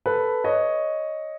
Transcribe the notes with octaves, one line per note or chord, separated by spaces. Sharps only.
A4 B4
C#5 D#5